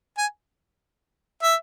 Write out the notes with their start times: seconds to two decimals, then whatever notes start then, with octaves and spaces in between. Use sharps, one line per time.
0.18 G#5
1.43 E5